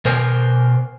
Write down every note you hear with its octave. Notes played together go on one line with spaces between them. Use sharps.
B2 A#4 C5 G#5